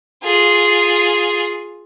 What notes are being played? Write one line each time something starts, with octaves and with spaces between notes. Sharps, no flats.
F4 G#4